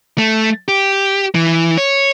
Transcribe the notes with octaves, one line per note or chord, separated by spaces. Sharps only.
A3
G4
E3
C#5